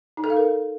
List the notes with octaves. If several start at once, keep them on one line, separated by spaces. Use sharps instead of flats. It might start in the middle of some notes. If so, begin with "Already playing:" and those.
D#4
A4
F5
A#4